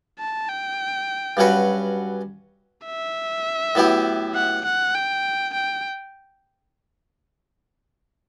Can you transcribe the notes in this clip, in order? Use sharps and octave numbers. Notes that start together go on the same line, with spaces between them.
A5
G5
G2 F#3 C#4 F#4 B4
E5
A2 F#3 B3 E4 G4
F#5
F#5
G5
G5